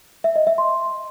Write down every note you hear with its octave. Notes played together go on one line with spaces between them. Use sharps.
E5
D#5
E5
C6